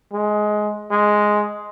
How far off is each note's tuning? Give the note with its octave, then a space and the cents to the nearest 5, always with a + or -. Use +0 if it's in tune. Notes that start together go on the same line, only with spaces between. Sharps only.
G#3 +15
G#3 +5